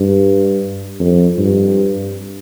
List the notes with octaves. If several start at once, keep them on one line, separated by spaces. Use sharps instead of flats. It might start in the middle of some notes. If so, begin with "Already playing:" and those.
Already playing: G2
F2
G2